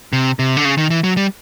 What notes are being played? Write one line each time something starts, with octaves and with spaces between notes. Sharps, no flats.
C3
C3
D3
C#3
D#3
E3
F#3
G3